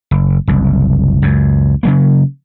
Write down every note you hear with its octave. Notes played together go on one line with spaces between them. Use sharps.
F#1
F#1 C2
C#2 F#2
C#3 F#3 A#3